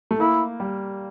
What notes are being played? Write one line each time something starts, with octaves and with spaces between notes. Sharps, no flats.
A3
A#3 E4
G3